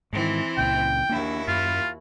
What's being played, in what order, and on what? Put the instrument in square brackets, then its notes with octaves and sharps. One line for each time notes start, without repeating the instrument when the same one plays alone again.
[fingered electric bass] G#2 D#3 [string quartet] E3 C4
[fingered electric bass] C#2 A#2 C#3 [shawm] G5
[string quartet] D#2 E4 F#4 [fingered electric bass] A#3 D4
[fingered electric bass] F#2 [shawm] F4